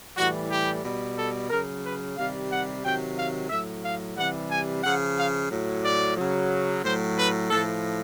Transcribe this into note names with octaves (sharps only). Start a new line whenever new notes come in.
A2 E3 G3 F#4
G4
B2 G3
A4
C#3 F#3 A#4
B4
C3 D#3 G3 F5
F#5
C3 D#3 F#3 G5
F5
A2 F#3 E5
F5
C3 E3 G3 F#5
G#5
C#3 F3 F#5
F5
A2 F#3
D5
C#3 F#3
A2 F#3 C5
B4
A2 F3 A4